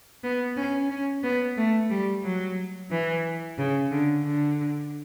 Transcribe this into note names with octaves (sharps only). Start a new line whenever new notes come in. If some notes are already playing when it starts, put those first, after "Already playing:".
B3
C#4
C#4
B3
A3
G3
F#3
E3
C#3
D3
D3